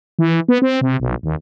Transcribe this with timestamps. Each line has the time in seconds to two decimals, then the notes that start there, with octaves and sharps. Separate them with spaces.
0.19 E3
0.49 B3
0.62 C4
0.81 C3
1.00 B1
1.23 D#2